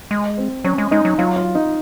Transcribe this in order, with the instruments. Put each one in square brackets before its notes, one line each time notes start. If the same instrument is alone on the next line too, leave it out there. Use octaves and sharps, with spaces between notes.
[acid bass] G#3
[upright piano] C4
[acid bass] F#3 [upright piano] C#4
[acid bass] G#3
[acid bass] G#3 [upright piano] D#4
[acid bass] F#3
[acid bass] F#3 [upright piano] F4
[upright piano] F4
D#4